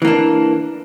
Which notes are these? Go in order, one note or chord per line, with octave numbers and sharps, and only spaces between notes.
E3 A#3 D4